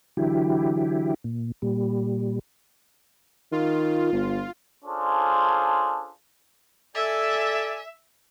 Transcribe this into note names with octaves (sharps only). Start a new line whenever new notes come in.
D3 E3 F#3 E4 G4
A#2
A#2 G3
D#3 F4
G1
C#4 D4 F4 G#4 A4 C5
A4 D5 E5 G#5